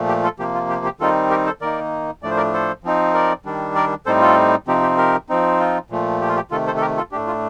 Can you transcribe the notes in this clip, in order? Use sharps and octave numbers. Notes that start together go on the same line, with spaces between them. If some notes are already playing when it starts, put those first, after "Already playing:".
Already playing: A#2 F3 A3
G4
F4 A4
C3 F3 A#3 G4
F4
G4
G4
D#3 G3 C4 D#4 F4 A4
G4 A#4
A4 C5
D#3 A#3 D#4 A#4 D5
A2 F3 A3 D4 D5
C5
A#4 D5
A4 C5
F3 C4 D#4
A#4 D5
D#3 G3 D4
A#4 D5
A2 G3 C4 D#4 A4 C5
F4 A4
C3 F3 C4 D#4 G4
G4
G4 A#4
F3 C4 D#4
F4
A#2 F3 A3
G4
F4
G4
C3 D#3 A3 F4 A4
A4 C5
A4
G4 A#4
F4 A4
A2 A3 D4 G4
F4